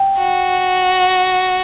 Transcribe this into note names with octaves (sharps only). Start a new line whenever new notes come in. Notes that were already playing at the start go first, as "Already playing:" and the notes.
Already playing: G5
F#4